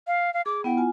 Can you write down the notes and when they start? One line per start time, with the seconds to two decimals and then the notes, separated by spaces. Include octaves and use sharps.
0.07 F5
0.34 F5
0.46 G#4 D6
0.64 B3 E4 F#5 G5
0.77 F4 G#5